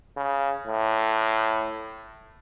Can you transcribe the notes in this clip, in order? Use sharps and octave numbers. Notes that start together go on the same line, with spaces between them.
C#3
A2